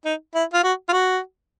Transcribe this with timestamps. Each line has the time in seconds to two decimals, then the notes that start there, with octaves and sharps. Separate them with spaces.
0.05 D#4
0.35 E4
0.53 F4
0.64 F#4
0.89 F4
0.92 F#4